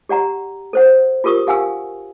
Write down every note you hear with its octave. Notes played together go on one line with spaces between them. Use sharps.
G4 D5 F#5 A#5
A4 C5 F#5
F4 G4 A#4 C#6 D#6
G4 F5 F#5 G#5 E6